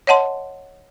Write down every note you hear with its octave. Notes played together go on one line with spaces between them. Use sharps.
C#5 D#5 F#5 A5 C6